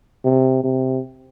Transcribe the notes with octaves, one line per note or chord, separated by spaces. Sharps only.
C3
C3